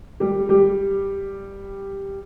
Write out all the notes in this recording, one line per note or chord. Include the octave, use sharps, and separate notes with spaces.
G3 G4
G3 G4